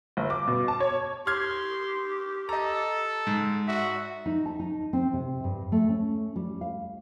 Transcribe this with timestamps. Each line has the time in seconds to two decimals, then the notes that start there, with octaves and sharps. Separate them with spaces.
0.17 G1
0.30 D6
0.48 B2
0.68 A5
0.80 C#5
1.27 G4 C6 F6 G#6
2.49 A4 D#5 A#5
3.27 G#2
3.68 F#4 E5
4.26 D#4
4.46 A5
4.59 D#4
4.93 C4
5.14 C3
5.44 G2
5.72 A3
5.89 C#4
6.36 G3
6.61 F5